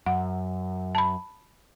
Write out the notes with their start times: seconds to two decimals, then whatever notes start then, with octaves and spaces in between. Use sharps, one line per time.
0.06 F#2 F#5
0.95 A5 B5